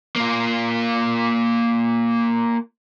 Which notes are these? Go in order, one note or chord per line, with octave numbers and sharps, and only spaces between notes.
A#3 F4